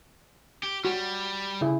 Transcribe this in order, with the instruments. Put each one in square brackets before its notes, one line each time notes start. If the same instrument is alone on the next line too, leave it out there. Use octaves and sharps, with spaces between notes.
[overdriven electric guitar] G4
[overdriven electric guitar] G3 [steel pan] F#4
[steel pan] C#3 E4 G#4